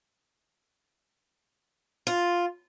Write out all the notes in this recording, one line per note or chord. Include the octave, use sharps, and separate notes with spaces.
F4